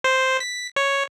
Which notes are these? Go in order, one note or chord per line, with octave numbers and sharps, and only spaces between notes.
C5
B6
C#5